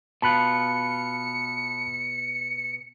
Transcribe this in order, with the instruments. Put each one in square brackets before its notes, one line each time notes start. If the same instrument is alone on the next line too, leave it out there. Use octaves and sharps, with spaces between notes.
[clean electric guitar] B2 F4 [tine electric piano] A5 B5 F#6 [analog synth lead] C#7